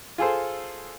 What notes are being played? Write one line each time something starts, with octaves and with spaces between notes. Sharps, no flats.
F4 G#4 A4 C5